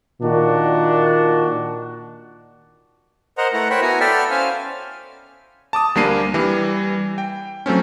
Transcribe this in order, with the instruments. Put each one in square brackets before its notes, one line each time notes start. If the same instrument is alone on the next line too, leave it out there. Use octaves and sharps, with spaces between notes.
[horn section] A#2 D#3 D4 F#4
[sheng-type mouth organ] A#4 C5 D#5 F#5 A#5
A3 E4 B4 F#5 A#5
A#4 C5 C#5 F#5 G5 B5
B3 E4 F#4 G#5 A#5
A4 D5 E5 G5 B5 F6
C#4 C5 F5 G#5 F6
[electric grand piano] A5 D6 D#6
D2 G3 A#3 D4 C7 D#7
E3 G3
G5
F#3 A3 C4 C#4